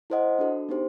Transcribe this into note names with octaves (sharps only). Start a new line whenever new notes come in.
E4 A4 C5 D#5 F#5
D4 F#4 A4
B3 D#4 G4 C5